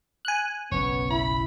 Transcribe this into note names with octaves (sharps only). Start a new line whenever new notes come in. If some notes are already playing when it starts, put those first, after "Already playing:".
G#5 F#6
F#1 B1 B3 C#4 C#5
E4 B5